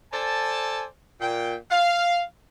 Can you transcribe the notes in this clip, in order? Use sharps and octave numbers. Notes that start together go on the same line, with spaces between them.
A4 C5 D5 G#5 A5
A#2 G5
F5